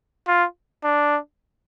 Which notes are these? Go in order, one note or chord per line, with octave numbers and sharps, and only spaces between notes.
F4
D4